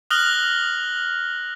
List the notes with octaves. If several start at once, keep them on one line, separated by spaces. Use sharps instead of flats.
D#6 F6 F#6 A#6 F#7 G7